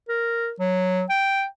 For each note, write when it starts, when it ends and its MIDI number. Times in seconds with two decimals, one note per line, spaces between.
0.09 0.51 70
0.60 1.03 54
1.10 1.45 79